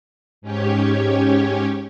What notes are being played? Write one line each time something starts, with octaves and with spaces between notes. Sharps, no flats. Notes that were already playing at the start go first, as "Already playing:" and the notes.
G#2 C#4 G4 C#5